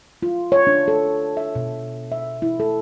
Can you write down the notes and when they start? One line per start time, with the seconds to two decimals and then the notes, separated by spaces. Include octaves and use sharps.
0.22 F4
0.52 C#5
0.67 D4
0.88 A4
1.37 E5
1.55 B2
2.12 E5
2.42 E4
2.60 A4